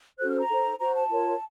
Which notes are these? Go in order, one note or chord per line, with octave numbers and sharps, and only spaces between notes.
C#4 F#4 A4 C5 F#6
F6
A#5
D#4 A4 C5
F#4 C5 A#5
A5
F4 A#4 C#5